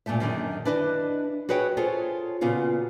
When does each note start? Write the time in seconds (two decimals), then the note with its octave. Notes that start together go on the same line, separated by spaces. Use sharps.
0.06 G2 A#2 G#3 A3 E5
0.20 F#2 D3 D#3 G#4
0.65 D4 E4 B4 D5 D#5
1.49 F#4 G#4 B4 C#5 D#5 G5
1.77 F4 G#4 A4 C5 C#5
2.41 A#2 C#3 B3 F4 F#4